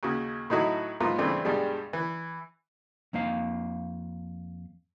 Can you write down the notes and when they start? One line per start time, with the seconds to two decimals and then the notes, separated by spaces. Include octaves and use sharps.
0.03 D#2 C#3 F#4
0.50 A2 F#3 D#4 E4 F#4 A4
1.01 G#2 A#3 B3 F4
1.18 G2 C#3 E3 A3 C4 D4
1.45 G2 B2 G3 G#3
1.93 E3
3.13 F2 A#3 D#4 F5